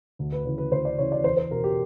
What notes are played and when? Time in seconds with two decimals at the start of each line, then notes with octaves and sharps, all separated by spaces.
0.19 D2
0.32 B4
0.45 C#3 E3 B4
0.58 B4
0.72 D2 C5
0.85 D5
0.98 C#3 E3 C#5
1.12 D5
1.24 E2 C5
1.37 C5
1.51 B2 A#4
1.64 G4